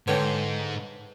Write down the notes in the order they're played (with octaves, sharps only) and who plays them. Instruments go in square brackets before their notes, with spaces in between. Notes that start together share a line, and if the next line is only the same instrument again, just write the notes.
[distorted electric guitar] G#2 [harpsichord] D3 [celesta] B4 [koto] C#5 G5